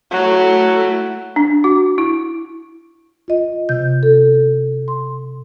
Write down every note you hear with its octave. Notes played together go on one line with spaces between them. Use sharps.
F#3 A3 E4
D4
F#4
E4
F4 D#5
C3 G6
A4
C6